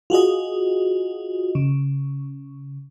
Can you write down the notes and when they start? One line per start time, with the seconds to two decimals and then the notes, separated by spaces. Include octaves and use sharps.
0.10 F4 F#4 G#4 D#5
1.55 C#3